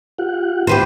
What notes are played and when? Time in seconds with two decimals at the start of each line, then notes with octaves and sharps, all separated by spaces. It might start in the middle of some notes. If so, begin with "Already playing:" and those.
0.19 F4 G4 F#5
0.67 G#2 E4 G4 B4 C5 C6